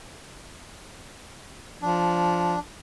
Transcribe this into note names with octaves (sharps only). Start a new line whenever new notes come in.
F3 D4